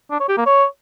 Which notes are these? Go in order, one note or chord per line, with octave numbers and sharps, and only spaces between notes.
D4
C#5
G4
A#3
C#5